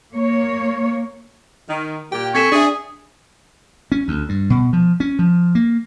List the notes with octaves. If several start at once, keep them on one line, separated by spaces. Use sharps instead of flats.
A#3 C#5
D#3
A#2 A#3 G4 G5
C4 A4 G#5 C#6 G#6 B6 E7
D4 G#4 D5 E5
C#4
D2
G2
B2
F3
C#4
F3
A#3